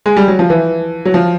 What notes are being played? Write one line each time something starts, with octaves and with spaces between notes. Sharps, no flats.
G#3
G3
F#3
F3
E3
F#3
F3